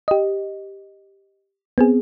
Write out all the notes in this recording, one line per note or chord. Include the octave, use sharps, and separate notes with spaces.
G4 D#5
B3 C4 G#4